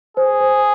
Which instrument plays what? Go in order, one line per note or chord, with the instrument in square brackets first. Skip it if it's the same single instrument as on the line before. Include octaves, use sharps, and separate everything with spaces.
[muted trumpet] G#4 [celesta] C5
[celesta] C5